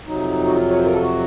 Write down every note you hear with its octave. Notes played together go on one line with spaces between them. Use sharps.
F2 C3 F#3 D#4
F#4
F4
C#5
C5
A#4
A4
F#4